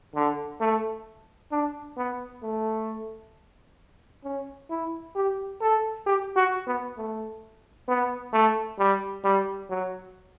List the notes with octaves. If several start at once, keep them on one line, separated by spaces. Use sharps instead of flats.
D3
A3
D4
B3
A3
C#4
E4
G4
A4
G4
F#4
B3
A3
B3
A3
G3
G3
F#3